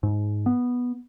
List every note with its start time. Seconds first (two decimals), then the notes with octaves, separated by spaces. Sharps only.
0.03 G#2
0.46 B3